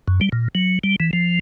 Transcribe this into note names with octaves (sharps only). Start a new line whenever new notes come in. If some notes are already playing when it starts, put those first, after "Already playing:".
F#2
G3
A#2
F#3
G3
E3
F3